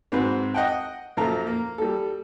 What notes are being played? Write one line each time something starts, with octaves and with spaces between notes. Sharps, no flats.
G#2 C4 F#4 B4
D#5 F#5 G5
F#2 A#2 F3 A3 A#3 A#5
A#3
G3 A4